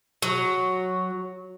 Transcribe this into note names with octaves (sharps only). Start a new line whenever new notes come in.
F#3